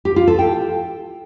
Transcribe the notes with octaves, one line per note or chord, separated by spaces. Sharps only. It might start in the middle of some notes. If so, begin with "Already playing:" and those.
G4
F4
A4
G5